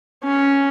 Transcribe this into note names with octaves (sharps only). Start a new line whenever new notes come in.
C#4